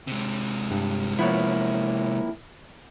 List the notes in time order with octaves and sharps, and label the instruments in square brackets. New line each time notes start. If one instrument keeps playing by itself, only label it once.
[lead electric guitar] C3 G#3
[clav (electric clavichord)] G2
[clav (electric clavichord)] F3 B3 C#5 [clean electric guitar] A#3 E4